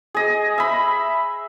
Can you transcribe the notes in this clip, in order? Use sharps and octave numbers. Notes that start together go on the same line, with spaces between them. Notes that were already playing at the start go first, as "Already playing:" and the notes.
G#4 D#5
E5 B5